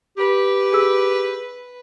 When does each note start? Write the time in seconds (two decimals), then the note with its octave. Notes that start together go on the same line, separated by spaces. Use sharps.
0.17 G4 B4
0.73 G#4 E6